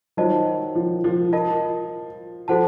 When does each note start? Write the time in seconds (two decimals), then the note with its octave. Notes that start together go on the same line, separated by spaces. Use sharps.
0.17 D#3 F#3 F4 C5 D#5 A5
0.75 F3
1.04 F3
1.33 F4 A#4 D#5 A5
2.48 F3 F#4 A4 C5 F#5 A5